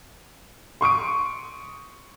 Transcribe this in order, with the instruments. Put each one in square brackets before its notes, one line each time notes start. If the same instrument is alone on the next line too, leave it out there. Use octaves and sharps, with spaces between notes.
[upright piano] C6 C#6 D#6 D7